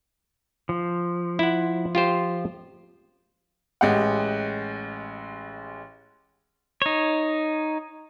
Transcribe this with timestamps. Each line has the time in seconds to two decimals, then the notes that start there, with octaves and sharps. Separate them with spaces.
0.69 F3
1.39 E4 F#5
1.95 F4 G4 C5
3.81 A1 G#3 G4 F#5
6.82 D#4 C#5